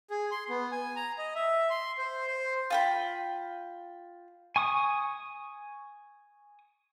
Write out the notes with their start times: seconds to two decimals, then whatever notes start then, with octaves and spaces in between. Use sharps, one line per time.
0.10 G#4
0.31 C6
0.49 B3
0.72 G#5
0.96 A#5
1.18 D#5
1.35 E5
1.70 C6
1.98 C5
2.27 C5
2.70 F4 G5 B5
4.56 G#5 C#6 D#6